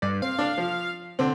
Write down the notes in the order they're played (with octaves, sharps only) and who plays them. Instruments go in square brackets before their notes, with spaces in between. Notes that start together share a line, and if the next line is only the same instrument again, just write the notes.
[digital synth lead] G2 [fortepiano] D5
[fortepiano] C4 [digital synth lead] F5
[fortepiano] D4
F3
D3 C4